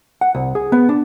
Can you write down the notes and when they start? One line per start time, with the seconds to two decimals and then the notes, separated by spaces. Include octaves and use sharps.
0.21 F#5
0.35 C2
0.55 G#4
0.72 B3
0.89 D4